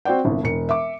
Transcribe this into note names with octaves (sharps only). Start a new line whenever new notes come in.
C4 F#4 C5 D5 G5
G1 C2
E1 C#7
E5 D6